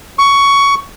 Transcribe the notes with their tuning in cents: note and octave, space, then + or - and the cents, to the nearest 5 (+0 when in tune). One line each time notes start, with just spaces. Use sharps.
C#6 +15